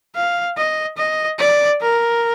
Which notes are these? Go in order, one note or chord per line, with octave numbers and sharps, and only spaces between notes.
F5
D#5
D#5
D5
A#4